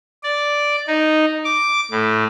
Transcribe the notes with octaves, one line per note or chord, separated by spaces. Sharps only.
D5
D#4
D6
A2